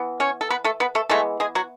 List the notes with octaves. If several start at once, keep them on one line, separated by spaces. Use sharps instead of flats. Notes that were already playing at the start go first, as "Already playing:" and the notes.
Already playing: E3 B3
C#4 C#5
A4
B3 B4
A3 A4
B3 B4
A3 A4
E3 G#3 A3 B3 A4
G#3 G#4
F#3 F#4